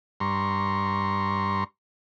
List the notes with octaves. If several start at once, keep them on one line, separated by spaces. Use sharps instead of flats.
G2 A#5 C6 C#6